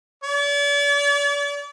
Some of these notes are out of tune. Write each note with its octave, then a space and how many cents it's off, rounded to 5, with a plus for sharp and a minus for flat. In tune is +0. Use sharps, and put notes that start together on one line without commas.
D5 -40